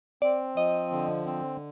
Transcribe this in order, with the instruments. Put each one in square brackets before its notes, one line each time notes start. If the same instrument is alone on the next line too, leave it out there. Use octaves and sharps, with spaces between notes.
[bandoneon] C4 [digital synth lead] D5
[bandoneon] F3 [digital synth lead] D#5
[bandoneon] D3
C4